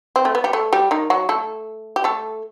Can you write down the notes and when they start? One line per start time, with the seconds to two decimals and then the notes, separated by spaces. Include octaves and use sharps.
0.16 C4
0.25 A3
0.35 B3
0.44 G3 G4
0.53 A3 A4
0.73 G3 G4
0.91 D#3 D#4
1.10 F#3 F#4
1.29 A3 A4
1.96 G4
2.04 A3 A4